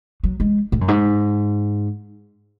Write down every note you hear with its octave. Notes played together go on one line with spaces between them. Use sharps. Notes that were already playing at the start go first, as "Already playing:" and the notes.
F#3
G#3
A2
F#2
G#2